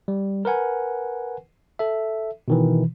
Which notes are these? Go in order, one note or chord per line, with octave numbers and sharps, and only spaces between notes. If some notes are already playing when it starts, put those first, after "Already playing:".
G3
A#4 B4 F#5 G#5
A4 E5
B2 D#3 E3